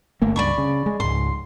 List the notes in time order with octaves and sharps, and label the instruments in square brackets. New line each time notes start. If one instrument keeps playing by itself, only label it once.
[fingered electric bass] G1 A3 A#3
[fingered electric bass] C#2 G2 [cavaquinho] D5 B5 C#6
[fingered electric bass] C#3
G#3
[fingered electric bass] C#2 G#2 [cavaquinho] C6